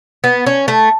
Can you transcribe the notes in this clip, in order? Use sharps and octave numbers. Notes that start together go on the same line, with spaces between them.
B3
C#4
A3